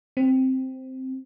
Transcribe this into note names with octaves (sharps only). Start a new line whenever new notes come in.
C4